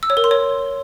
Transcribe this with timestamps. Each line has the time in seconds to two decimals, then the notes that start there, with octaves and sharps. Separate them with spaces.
0.03 E6
0.10 C#5
0.17 A#4
0.24 C6
0.31 C#5